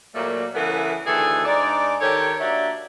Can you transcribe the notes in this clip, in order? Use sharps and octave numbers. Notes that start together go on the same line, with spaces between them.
A#2 F#3 G3 A3 A#3
C#3 E3 A3 B3 G#4 A#4
D2 D#3 E3 G#4 A4
G#2 D4 D#4 D5
D#3 G4 A4 C#5
A#3 D4 F#4 G4 E5